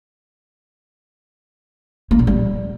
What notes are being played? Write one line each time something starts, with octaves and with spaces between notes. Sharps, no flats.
A#3
A#2
G3